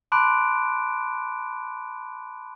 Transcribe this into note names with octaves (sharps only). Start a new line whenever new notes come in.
A5 B5 C6 D6 F#6 D7